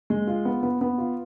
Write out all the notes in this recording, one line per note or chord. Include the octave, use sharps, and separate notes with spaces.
G#3
F4
B3
B3
B3
F4